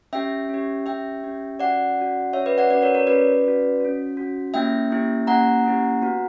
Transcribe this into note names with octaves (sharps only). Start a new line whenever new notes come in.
C#4 G4 E5 G5
C#4 G4
C#4 G4 E5 G5
C#4 G4
C#4 F#4 D5 F#5
C#4
F#4
C#4 F#4 C#5 E5
B4 D5
D5 F#5
C#4 F#4 B4 D5
A#4 C#5
A#4 C#5
C#4 F#4 B4 D5
C#4 F#4
C#4 F#4
C#4 F#4
A#3 C#4 E4 G4 E5 G5
A#3 C#4 E4 G4
A#3 C#4 E4 G4 F#5 A#5
A#3 C#4 E4 G4
B3 F#4